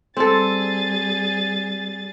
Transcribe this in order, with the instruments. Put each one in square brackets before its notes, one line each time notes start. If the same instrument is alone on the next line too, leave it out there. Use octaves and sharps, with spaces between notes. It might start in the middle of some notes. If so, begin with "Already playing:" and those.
[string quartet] G3 G#4 A6 [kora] C4 A4